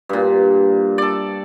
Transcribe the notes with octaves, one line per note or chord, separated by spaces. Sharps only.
G2 A#2
A4 D5